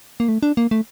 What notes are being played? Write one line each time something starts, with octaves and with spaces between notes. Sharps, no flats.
A#3
A3
D4
A#3
A3